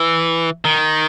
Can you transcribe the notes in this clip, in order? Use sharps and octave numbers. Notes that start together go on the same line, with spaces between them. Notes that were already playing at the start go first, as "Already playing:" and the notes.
Already playing: E3
D#3